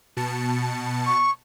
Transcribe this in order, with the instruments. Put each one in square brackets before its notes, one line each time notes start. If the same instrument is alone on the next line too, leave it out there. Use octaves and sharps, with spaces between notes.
[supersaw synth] B2 A5 C#7
[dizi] C#6